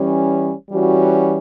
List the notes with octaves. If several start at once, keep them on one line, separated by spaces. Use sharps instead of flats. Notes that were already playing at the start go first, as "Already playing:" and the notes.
Already playing: E3 G3 C#4
E3 G3 C#4 F#4